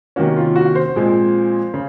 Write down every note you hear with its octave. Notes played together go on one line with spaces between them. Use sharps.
C3 D#3 A#3 C#4 F#4
F4
F#4
C5
A#2 F3 G#3 C4
C#3